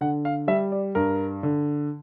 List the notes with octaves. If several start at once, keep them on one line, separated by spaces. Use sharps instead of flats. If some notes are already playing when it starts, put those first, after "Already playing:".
D3 F#5
F5
G3 E5
D5
G2 A#4
D3